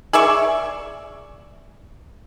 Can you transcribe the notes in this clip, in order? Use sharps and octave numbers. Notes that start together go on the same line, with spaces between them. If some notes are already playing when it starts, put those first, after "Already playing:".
G#4 D5 E5 C#6